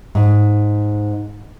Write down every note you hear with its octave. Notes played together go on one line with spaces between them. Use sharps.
G#2